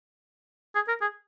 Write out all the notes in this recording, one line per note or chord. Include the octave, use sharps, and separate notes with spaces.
G#4
A#4
G#4